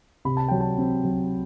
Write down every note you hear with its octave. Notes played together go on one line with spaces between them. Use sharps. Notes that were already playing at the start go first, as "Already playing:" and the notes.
C3 B5
A5
F#3 G5
A5
C4
F#3